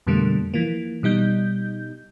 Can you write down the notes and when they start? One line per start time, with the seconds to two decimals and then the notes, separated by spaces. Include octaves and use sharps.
0.07 F2 B2 D3 G3 A3 A#3
0.54 E3 F3 A#3
1.03 B2 G3 D#4 G6